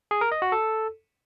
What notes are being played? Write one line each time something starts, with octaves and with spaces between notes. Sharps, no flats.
G#4
A#4
D#5
F#4
A4